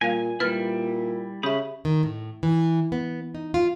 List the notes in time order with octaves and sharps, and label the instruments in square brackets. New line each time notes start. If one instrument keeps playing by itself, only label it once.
[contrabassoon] A#2 [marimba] G3 F5 [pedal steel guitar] G#5
[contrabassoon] A#2 [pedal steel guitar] G3 E4 [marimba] B4 F6 A6
[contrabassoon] C#3 [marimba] G4 E5 [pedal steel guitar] B5 D#6
[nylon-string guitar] D#3
A2
E3
B3
D#4
F4